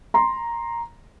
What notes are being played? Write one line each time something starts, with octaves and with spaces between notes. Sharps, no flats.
A#5 C6